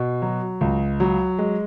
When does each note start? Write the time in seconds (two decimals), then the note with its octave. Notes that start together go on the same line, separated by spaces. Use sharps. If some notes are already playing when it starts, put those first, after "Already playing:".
Already playing: B2
0.22 F#3
0.61 C#2
1.00 F#3
1.39 G#3